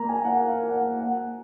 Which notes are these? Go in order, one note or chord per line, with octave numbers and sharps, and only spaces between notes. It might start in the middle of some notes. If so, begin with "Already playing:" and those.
Already playing: A#3 A#5
G#5
F#5
F5
F#5
F#5